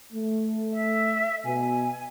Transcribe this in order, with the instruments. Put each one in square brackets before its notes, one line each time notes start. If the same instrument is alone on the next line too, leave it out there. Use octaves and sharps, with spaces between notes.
[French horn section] A3
[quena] E5
[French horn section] B2 [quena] G#5